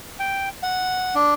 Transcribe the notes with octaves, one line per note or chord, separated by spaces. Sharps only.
G5
F#5
D4